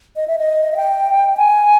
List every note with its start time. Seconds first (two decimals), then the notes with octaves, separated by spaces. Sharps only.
0.16 D#5
0.28 E5
0.38 D#5
0.72 E5
0.76 G5
1.37 G#5